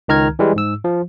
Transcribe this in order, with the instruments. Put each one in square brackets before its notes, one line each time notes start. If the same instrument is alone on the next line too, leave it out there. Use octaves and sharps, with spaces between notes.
[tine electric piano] C#2 D#3 A#5 F6 G#6
E3 G3 G#3
G#2 E6
F3